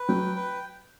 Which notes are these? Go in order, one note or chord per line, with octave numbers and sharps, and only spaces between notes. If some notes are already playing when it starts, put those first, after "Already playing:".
Already playing: B4
F#3 G5
B4